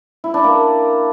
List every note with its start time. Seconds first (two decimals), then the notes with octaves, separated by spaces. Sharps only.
0.24 E4
0.34 D4
0.44 A#3